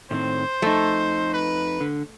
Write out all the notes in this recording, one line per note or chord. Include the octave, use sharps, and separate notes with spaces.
A2 D#3 C4 C5
F2 A3 D#4
B4
D3